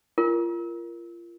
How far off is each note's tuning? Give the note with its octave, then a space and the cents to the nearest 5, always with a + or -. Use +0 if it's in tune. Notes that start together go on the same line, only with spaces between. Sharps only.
F4 -30 A#4 +0